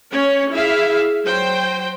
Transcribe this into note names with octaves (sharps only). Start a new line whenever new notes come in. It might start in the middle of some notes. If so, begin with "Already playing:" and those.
C#4 C#5
E4 G#4 E5 F5
F#3 C5 G5